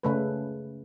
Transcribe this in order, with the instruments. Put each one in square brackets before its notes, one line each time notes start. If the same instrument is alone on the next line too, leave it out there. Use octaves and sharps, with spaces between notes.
[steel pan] C#3 A3 B4